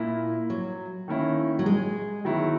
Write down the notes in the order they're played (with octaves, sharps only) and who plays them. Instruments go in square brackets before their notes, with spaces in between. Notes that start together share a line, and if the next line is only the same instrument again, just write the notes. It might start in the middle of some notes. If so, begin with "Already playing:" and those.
Already playing: [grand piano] A#2 A#3 E4
[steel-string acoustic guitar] F#3
[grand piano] D#3 A#3 C#4 E4
[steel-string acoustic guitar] F#3
G#3
[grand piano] D#3 F#3 B3 E4